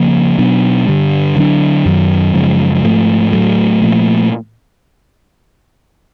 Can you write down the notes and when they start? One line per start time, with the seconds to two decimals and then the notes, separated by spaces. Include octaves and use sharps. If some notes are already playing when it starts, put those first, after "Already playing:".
Already playing: C#3 F3 A#3
0.38 B2 F#3 B3 D4
0.87 G2 D3 G3
1.36 D3 F#3 A3 D4
1.86 F#2 D#3 F#3
2.34 F#2 C#3 F3 G#3
2.83 G#2 F3 A3
3.32 A2 F#3 A3
3.82 A#2 F3 A3